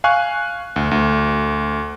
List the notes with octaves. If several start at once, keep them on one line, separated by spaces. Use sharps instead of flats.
F5 G#5 C#6 F#6
D2
D2